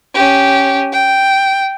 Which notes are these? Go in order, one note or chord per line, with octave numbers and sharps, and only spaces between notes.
C#4 G4
G5